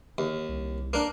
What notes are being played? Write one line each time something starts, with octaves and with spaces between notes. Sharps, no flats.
D#2
C2
A#3 D4